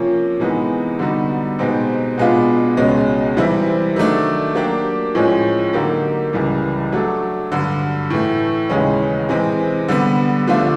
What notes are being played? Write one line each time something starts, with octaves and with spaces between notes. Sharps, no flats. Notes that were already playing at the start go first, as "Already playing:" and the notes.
Already playing: C3 F3 A#3 C#4
C3 E3 G#3 B3 D#4
D3 G3 B3 D#4 F#4
B2 G#3 C4 D#4 G4
B2 G#3 B3 D4 F4
C#2 B2 G#3 C#4 F#4
C3 E3 G3 C4 E4
D#3 F#3 A3 D4
F#3 A#3 D4 G4
A2 F3 G#3 C#4
D3 F#3 A#3 D#4 G4
C#2 C#3 E3 G3
F#3 A3 D4 F#4 A4
G2 D3 F#3
A2 E3 A3
D#2 C#3 E3 G#3 C#4
C3 E3 G#3 C4
D3 G3 B3
D3 F3 A3 D4 F4